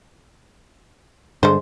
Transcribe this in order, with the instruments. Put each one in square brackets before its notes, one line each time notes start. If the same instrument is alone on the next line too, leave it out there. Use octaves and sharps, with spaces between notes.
[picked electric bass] G2 D3 [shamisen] G#3 C5